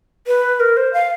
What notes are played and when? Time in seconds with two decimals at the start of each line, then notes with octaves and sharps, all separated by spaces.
0.27 B4
0.60 A#4
0.77 C5
0.93 F5